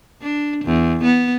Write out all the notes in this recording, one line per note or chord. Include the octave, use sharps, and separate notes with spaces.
D4
E2
B3